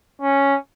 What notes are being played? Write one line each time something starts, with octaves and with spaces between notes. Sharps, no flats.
C#4